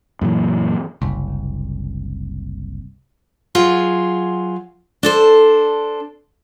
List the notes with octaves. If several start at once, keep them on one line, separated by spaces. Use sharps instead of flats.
F#2 A#2 E3
F#1 C2
F#3 F4 G#4 C5
D4 A4 C5